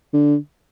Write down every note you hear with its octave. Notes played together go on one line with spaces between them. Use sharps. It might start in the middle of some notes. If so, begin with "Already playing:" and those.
D3